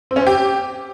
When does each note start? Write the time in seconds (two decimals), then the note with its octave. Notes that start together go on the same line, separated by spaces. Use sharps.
0.11 C4
0.16 C#4
0.21 C4
0.27 G4